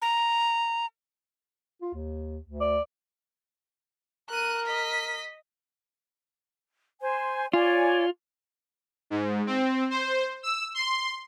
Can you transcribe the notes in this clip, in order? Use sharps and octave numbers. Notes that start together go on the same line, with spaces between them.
A#5
F4
D#2
D2
D5
A#4 F#6 D#7
D#5 B6
C5 G#5
F4 C#5 D5 G#5
G#2
C4
C5
E6
C6